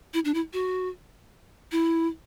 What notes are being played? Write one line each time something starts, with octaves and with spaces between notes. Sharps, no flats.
E4
D4
E4
F#4
E4